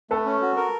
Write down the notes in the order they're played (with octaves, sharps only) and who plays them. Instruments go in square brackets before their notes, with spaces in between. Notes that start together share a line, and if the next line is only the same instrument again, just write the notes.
[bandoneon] A3 [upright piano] A4 B4
[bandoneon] C#4
F#4
A#4